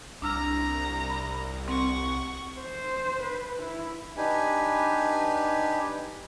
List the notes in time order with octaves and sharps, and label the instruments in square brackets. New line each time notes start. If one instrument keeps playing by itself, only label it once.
[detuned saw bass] C2 [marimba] D4 E6 F6 [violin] A#5
[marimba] B5
[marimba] C4 [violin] F#5 C#6
[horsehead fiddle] C5
B4
E4
[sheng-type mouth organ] D4 D#4 G4 B4 G#5